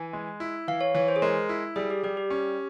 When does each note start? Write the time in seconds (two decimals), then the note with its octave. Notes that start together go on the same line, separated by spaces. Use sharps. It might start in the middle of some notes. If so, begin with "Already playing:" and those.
Already playing: E3 G#5
0.13 G#3
0.40 E4
0.68 E3 F5
0.81 C#5
0.94 E3 C#5
1.08 C5
1.16 G#4
1.22 G#3 A#4
1.49 E4
1.76 G3 G#4
1.90 G4
2.03 G3 G4
2.17 G4
2.30 C#4